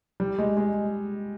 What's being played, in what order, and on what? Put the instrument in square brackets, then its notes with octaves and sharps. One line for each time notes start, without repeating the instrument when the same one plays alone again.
[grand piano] G3
G#3
G#3